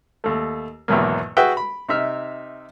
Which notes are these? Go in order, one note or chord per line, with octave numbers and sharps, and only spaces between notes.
D#2 A3
G#1 E2 B2 F#3 A#3
F#4 G#4 B4 E5 F#5 G5
B5
C3 D#4 E5 F6